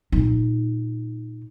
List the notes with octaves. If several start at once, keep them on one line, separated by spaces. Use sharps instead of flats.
A#2 D#4